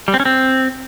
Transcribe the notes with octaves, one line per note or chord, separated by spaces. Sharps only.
G3
C4
C#4
C4